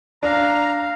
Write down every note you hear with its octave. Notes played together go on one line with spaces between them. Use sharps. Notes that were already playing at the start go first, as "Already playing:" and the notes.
D4 F5 A#5